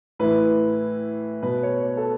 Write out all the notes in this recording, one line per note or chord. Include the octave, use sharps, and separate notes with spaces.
A2 E3 B4
B2 B4
C#5
C#5
A4